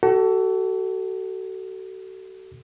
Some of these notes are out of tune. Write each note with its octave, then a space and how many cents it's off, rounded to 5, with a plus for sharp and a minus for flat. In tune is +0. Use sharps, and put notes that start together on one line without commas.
F#4 +40 A4 +10